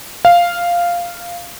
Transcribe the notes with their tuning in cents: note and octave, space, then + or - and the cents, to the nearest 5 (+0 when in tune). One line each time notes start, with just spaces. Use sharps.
F5 -5